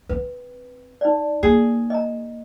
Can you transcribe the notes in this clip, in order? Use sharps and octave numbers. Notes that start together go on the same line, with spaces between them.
C4 B4
D#4 D5
A#3 G#4
D#5 A#5